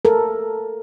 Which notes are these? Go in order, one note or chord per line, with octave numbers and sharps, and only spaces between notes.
A4 A#4